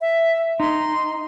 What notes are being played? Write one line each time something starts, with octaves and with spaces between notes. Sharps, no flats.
E5
D#4 C6